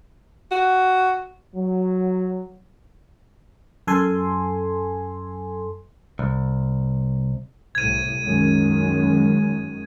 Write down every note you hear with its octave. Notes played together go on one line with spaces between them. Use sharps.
F#4
F#3
F#2 A4 G#5 C6
C2
C2 A2 G#6 D#7
F#2 D#3 G#3